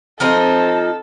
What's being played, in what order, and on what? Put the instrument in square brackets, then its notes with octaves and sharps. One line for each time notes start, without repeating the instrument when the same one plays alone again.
[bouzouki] F3 C4 D#4 [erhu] A4